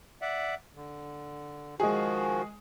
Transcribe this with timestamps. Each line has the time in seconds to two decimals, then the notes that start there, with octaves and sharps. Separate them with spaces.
0.22 D5 E5 F#5
0.75 D3
1.80 D#3 F3 G#3 F#4 G#4